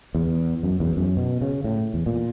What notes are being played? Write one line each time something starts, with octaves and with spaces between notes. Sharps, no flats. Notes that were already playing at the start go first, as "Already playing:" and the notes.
E2
F#2
E2
F#2
B2
C#3
A2
E2
A#2